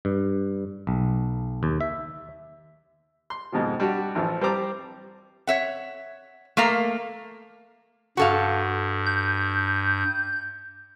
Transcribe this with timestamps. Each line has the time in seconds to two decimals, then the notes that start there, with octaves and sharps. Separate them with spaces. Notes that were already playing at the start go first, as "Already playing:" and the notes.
0.05 G2
0.87 B1
1.63 D#2
1.81 E5
3.30 C6
3.52 F2 G#2 B2 D#3 F3
3.80 G3 D4 F#4
4.15 A1 E3 F3
4.41 G3 C4 C5 A5 A#5 D6
5.47 C#5 E5 F#5
6.57 A3 A#3 F5 A#5
8.17 G2 F#4 A4 F5
9.06 G6